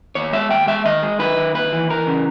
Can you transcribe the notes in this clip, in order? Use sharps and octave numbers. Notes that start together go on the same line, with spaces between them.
D#2 C#5
G#3 E5
D#2 G5
G#3 E5
D#3 D#5
G#3
D#3 B4
D#3
D#2 B4
E3
E3 A#4
C#3